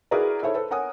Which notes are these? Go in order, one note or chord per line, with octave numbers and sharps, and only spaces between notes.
E4 F#4 G#4 A#4 B4 D5
E4 A4 C5 C#5 E5
A4 B4 C5
A#4 C#5 F#5 G#5 D#6